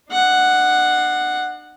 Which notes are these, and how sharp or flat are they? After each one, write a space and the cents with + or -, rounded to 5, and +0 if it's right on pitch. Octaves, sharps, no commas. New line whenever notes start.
D4 +45 F#5 +0